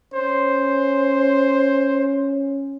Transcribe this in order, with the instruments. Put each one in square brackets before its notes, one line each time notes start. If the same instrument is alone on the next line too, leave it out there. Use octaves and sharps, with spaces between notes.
[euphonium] C#4 [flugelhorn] C5